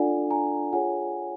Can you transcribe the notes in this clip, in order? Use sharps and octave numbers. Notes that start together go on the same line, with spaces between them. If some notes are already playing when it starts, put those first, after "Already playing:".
Already playing: D4 F4 A4 D5 F#5 G#5
G#5 A#5
F4 G#4 C#5 F#5 G#5